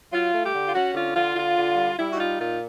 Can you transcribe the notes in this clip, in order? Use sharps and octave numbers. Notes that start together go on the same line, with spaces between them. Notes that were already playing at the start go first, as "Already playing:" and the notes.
F#3 F4
A3
G4
D3
F4
C#4 F#4
D3 F4
D3 F4
D3 F4
D3
G3
G3 E4
F#4
D#4 F4
A#2 F4